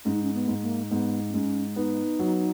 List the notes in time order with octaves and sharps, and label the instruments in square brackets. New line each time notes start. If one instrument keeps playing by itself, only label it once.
[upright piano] G#2 [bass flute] C#4
[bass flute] D#4
C#4
B3
[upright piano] G#2
[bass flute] A#3
[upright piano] G#2 [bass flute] B3
[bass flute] B3
[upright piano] G#2 [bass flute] C#4
[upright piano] B3 [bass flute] D#4
[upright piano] F#3